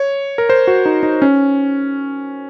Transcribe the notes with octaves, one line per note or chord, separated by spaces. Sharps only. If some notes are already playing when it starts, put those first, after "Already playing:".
Already playing: C#5
A#4
C5
F#4
D#4
D#4
C#4